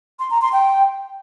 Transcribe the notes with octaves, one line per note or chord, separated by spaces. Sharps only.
C6
A#5
C6
G5